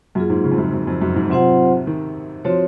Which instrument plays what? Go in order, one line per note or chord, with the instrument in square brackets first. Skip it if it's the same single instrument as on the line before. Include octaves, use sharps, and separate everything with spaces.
[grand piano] F#2 [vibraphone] F#3 A#3 F4 G#4
[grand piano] G#2
C#3
F2
F#2
F#2
F2
F#2
G#2
[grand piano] C3 [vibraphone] F#3 C4 F4 C5 F#5
[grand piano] D#3
[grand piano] F3 [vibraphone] C4 F#4 C#5